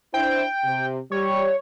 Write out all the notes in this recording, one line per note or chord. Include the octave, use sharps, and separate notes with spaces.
D4 E4 C5 G5
C3
G3 C#5